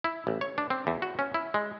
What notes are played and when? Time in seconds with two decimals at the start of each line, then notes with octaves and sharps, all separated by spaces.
0.04 E4
0.27 A1
0.41 C#5
0.58 D4
0.70 C4
0.87 E2
1.02 F#4
1.19 C#4
1.34 E4
1.54 G#3